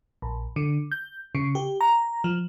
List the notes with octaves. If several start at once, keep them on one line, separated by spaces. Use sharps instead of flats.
A#1
D3
G6
C#3
G4
A#5
F3